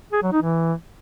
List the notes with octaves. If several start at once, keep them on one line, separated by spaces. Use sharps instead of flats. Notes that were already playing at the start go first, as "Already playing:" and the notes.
G#4
F#3
D#4
E3